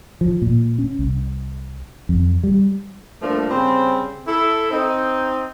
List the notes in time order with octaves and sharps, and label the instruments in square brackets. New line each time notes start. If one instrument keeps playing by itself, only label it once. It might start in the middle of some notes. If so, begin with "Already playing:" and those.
[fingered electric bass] F3
A#2
C#4
C2
F2
G3
[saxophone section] G2 F3 A3 A#3 D4
C#3 G3 C4
E4 A4
C4 D#4